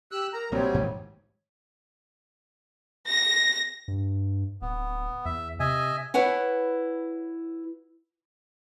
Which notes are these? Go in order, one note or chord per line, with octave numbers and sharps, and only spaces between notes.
G4 E6 F#6
A#4 A#5
A#1 C3 F#3 G3 A#3 C4 C#5
G#2 D#3 G#3
A#6
G2
D1 B3
E2 E5
C3 D#5 E5 G#5
E4 B4 C#5 F#5 G#5